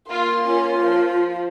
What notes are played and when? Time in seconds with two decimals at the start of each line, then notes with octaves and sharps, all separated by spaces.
0.10 A#3 F4 C6
0.47 C#4 F4
0.83 F3